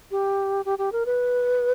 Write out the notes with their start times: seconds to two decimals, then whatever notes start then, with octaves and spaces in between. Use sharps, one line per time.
0.11 G4
0.65 G4
0.79 G4
0.92 A#4
1.06 B4